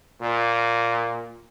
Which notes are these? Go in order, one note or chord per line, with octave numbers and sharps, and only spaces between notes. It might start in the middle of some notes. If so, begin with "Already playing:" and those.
A#2